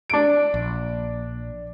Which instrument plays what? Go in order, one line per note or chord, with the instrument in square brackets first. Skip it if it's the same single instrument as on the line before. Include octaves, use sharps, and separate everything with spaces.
[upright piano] D4 D7
[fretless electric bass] A#1